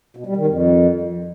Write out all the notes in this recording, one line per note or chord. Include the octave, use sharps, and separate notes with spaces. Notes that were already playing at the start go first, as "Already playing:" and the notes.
B2
G3
D#3
F2